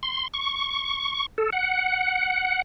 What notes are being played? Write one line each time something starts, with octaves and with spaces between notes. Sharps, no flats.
C6
C#6
A4
F#5